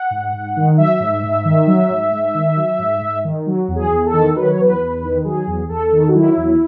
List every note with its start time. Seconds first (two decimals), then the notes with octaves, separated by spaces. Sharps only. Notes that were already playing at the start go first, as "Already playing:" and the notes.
Already playing: F#5
0.10 G#2
0.33 G#2
0.56 D#3
0.78 F#3 E5
1.00 G#2
1.23 G#2
1.45 D#3
1.67 F#3
1.90 G#2
2.12 G#2
2.34 D#3
2.56 F#3
2.79 G#2
3.01 G#2
3.24 D#3
3.47 F#3
3.68 E2
3.76 G#4
3.91 E2
4.06 A4
4.13 D#3
4.36 F#3 B4
4.48 C#5
4.59 E2 B4
4.81 E2
5.03 D#3
5.24 F#3 G#4
5.47 E2
5.69 E2 A4
5.92 D#3
6.08 F#4
6.15 F#3 E4
6.36 E2